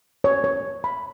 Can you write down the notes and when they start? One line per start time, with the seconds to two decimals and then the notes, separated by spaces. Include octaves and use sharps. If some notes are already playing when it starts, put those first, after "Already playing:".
0.24 C#5
0.44 C#5
0.84 B5